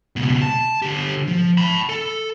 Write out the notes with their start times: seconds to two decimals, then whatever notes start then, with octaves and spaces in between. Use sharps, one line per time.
0.16 C#2 B2
0.41 A5
0.82 D3 G4
1.28 F3
1.58 A5 B5
1.89 A4